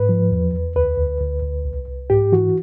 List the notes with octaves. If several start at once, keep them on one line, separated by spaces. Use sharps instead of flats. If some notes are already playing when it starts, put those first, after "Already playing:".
Already playing: G#2 B4
F3
E2
E2
D2 B4
D2
D2
D2
C2
C2
G#2 G4
E3 F#4